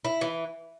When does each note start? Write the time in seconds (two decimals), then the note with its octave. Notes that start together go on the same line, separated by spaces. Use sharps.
0.05 E4
0.21 E3